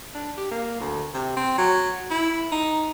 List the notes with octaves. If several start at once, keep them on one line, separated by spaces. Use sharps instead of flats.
D4
G4
A#3
D2
C3
C4
F#3
E4
D#4